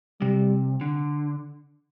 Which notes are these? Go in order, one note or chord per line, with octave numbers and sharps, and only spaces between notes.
C3 G3
D3